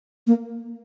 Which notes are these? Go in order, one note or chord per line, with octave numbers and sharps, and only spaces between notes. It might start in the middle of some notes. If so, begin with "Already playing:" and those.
A#3